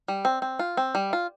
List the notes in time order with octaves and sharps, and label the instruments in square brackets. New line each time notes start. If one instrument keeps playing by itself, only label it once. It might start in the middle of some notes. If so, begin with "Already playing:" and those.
[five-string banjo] G3
C4
C4
F4
C4
G3
F4